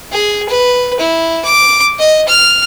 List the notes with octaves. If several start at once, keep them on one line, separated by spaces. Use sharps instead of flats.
G#4
B4
E4
D6
D#5
F6